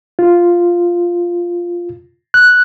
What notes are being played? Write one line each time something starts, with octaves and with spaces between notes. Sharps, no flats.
F4
F#6